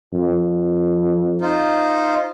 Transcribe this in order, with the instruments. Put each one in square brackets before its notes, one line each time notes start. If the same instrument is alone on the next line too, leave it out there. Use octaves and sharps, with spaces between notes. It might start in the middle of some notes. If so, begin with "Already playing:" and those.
[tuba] F2
[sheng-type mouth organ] D#4 F4 C5